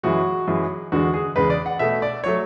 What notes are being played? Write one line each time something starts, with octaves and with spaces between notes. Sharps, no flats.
F#2 E3 G#3 F#4
F#2 E3 G#3
E2 D3 G#3 F#4
G#4
E2 C#3 G#3 B4
D5
F#5
B2 A3 E5
D5
F#3 A3 C#5